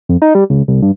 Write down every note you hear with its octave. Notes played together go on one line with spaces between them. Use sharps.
F2
D#4
G3
C#2
C2
G2